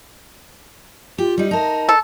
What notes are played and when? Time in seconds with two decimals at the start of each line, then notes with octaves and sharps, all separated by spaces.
1.18 F4 G4
1.38 G3 D#4
1.51 D#4 A#4 A5
1.89 A4